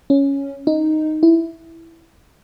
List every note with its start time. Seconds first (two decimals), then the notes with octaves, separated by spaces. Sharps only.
0.10 C#4
0.67 D#4
1.23 E4